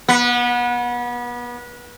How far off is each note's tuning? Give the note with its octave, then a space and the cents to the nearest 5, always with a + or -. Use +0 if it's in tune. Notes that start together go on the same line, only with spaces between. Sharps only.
B3 -30